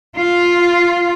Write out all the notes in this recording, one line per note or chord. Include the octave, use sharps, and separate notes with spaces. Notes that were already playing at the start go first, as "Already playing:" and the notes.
F4